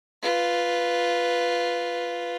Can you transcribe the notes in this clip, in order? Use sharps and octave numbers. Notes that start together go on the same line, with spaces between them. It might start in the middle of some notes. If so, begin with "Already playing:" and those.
F4 B4